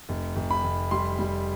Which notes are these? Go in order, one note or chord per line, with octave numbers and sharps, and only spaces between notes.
F1
F1
B5
F1
G3 C6
G3